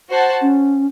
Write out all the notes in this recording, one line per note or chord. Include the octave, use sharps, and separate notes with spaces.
F#4 C5 F#5 A5
C#4